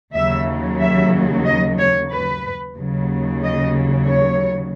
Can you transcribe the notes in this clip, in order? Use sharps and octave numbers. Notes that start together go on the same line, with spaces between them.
D#2 C#3 F#3 E5
E5
D#5
C#5
B4
D#2 C#3 F#3
D#5
C#5